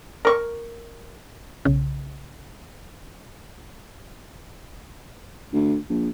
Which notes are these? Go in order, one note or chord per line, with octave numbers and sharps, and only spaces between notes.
A#4 C#6
B1 C#3
D2
A#1